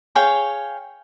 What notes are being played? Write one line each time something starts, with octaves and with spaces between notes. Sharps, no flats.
G#4 C#5 F5 G5